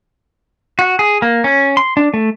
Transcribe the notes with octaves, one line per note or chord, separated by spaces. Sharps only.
F#4
G#4
A#3
C#4
C6
D4
A3